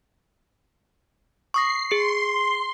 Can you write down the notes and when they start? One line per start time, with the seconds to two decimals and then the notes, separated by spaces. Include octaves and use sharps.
1.54 C#6 D#6 A#6 C7
1.91 G#4 C6 C#7